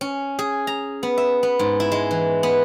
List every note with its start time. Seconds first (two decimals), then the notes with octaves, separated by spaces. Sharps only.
0.01 C#4
0.39 G#4
0.67 A#5
1.03 B3
1.18 E5
1.43 B3
1.59 G#2
1.80 E4
1.92 G#3
2.11 E3
2.43 B3